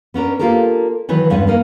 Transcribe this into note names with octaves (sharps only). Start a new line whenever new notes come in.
B3 C#4 D4 A#4
A#3 D4 F4 G4 A4 A#4
D#3 E3 F#3 B4
E2 G2 G#3 C#4 B4
A#3 D#4 A#4 F5